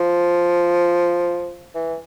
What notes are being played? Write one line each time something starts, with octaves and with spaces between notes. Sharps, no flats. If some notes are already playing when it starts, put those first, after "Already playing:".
Already playing: F3
E3